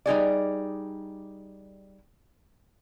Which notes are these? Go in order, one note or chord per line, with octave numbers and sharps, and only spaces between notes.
G3 D#4 G#4 D5